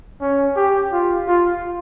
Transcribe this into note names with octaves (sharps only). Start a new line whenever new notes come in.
C#4
G4
F4
F4